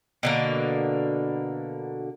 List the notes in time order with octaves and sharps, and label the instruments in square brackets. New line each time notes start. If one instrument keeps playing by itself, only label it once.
[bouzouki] B2 D3 A#3